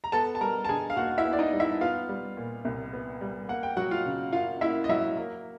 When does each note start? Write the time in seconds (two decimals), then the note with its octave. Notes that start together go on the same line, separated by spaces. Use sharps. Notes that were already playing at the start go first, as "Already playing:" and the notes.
0.04 A#5
0.12 B3 A4 A5
0.35 A5
0.41 G3 A#4 A#5
0.65 A5
0.69 D3 G#4 G#5
0.90 F5
0.96 D#2 F#4 F#5
1.18 E4 E5
1.25 B3
1.33 D5
1.39 D#4 D#5
1.53 G3
1.60 E4 E5
1.81 B3 F4 F5
2.09 G3
2.37 A#2
2.65 C2
2.93 B3
3.21 G3
3.49 A#3 F#5
3.63 G5
3.76 F#3 F#4 F#5
3.91 F4 F5
4.06 C#3
4.33 F#2 F4 F5
4.61 A#3 E4 E5
4.84 D#5
4.89 F#3 E4 E5
5.17 A#3